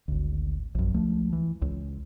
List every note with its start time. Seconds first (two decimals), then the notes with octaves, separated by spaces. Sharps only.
0.08 G#1 D2
0.75 A#1 F#2
0.94 C#2 F3 A3
1.33 E3
1.62 C#2